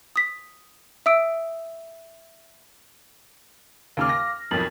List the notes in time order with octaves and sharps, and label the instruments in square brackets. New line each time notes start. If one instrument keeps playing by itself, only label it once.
[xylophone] D#6 B6
E5 D#6 E6 D7
[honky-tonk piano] D#2 C#3 F6 [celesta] F5 D6
[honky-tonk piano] A#6
[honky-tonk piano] B1 F2 [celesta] A#4 A6 F#7